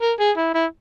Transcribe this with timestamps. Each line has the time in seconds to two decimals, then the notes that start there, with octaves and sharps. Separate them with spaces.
0.01 A#4
0.19 G#4
0.37 E4
0.54 E4